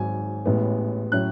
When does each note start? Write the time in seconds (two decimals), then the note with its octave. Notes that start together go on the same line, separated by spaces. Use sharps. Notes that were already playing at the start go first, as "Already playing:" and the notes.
Already playing: G#1 G#2 F#3 G#5
0.45 A1 A2 G#3 B3
1.12 A2 F#3 C#4 F#6